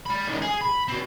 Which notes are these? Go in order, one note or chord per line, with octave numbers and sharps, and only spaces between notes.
D5 B5
C#2 D#3
G#4
B5
C4 F#4